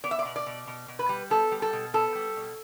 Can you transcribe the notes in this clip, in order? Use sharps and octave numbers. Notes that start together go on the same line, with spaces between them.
B3 D5
E5
D5
B2
D5
B2
B2
B2
B4
G3
B3 A4
G3
A4
B2
B3 A4
G3
B2